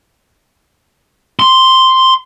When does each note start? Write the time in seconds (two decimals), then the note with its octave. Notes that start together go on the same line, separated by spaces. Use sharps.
1.39 C6